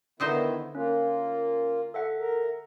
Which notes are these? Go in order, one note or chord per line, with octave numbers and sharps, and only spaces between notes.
D3 D#3 B3 D#4 E4 C5
A#3 C#4 F4
A4 E5 F#5
A#4